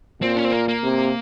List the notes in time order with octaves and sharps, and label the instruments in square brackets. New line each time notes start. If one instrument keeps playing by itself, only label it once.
[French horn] A#2 [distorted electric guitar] C4
[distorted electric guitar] C#4
C4
A#3
A#3
[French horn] C3